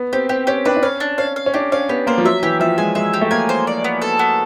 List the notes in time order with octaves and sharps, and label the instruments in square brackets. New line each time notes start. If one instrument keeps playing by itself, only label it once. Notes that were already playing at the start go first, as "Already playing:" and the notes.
Already playing: [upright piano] B3
[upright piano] C4 [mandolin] G4
[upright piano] C4 [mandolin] G4
[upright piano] C#4 [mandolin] G4
[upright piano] D4 [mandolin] B4
[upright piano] D4
[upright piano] C#4 [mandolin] F5
[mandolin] D4
[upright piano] C#4 [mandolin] F5
[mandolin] F5
[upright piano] C#4
[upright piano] D4 [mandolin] G4
[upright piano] C#4 [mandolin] F5
[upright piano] B3 [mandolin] G4
[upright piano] A#3 [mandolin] C5
[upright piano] F3
[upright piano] F#3 [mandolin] E5
[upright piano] E3 [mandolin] G4
[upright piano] F3 [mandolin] E5
[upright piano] G#3 [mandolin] G#5
[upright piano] G#3 [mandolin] E5
[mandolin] G4
[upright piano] A3
[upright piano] A#3 [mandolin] G#5
[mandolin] C5
D5
B3
A4
B3